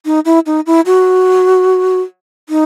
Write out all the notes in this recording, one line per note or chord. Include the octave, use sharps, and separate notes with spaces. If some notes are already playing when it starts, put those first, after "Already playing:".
D#4
E4
D#4
E4
F#4
D#4